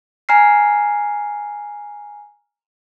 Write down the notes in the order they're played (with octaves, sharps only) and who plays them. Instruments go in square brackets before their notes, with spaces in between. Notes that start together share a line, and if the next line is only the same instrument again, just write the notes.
[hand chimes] G#5 A#5 F6 C7